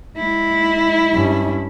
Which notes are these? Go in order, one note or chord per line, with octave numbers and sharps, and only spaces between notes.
G#3 E4
G2 C#4